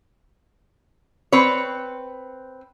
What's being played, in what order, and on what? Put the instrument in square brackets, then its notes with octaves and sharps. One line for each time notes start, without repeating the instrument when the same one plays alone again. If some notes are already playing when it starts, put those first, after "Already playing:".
[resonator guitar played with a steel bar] C4 B4 C#5